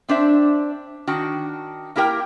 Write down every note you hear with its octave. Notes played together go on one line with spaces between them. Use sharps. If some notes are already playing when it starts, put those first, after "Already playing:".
C4 D4 C5 E5
D#3 D4 F#4 G5
A#3 E4 G4 A#4 G5